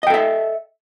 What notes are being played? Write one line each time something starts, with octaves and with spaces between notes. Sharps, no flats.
A4 D#5 E5 G5